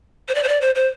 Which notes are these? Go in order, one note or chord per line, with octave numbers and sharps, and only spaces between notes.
C5
D5
C5
D5
C5
C5